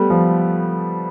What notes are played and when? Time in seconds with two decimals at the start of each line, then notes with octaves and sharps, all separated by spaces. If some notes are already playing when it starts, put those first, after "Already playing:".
Already playing: G3 A3 B3
0.10 F3